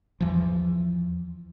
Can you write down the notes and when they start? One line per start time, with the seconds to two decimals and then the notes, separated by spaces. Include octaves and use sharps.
0.21 E2 E3 F3